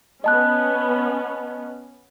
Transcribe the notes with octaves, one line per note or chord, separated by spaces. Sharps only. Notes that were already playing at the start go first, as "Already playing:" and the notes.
B3 C#4 D#5 A5 F#6